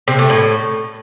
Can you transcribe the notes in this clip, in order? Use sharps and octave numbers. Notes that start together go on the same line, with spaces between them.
C3
A3
A2